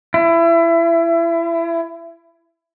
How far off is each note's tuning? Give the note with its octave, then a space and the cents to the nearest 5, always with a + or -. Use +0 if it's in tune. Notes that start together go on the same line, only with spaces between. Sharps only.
E4 +25